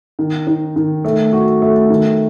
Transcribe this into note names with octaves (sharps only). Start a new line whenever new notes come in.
D#3
D#4
D#3
A3
F#4
A3
D#3